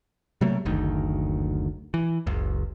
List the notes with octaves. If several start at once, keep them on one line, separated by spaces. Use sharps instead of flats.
C3 F#3 A3 A#3
F#1 D2 D#3
E3
F#1 C#2